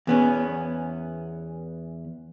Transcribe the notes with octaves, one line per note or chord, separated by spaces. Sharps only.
E2 B3 C#4